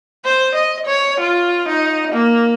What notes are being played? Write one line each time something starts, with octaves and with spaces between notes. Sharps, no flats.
C5
D#5
C#5
F4
D#4
A#3